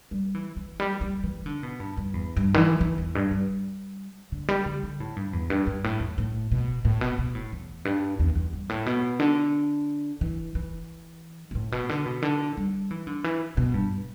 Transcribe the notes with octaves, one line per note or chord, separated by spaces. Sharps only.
G3
E3
E3
G3
G3
E3
D3
B2
G2
G2
E2
G2
D3
E3
E3
E2
G2
G3
D3
G3
D3
D3
A2
G2
E2
G2
G2
A2
E2
A2
B2
A2
B2
B2
A2
E2
G2
E2
E2
G2
A2
B2
D3
E3
E3
B2
A2
B2
D3
B2
D3
G3
E3
D3
E3
B2
G2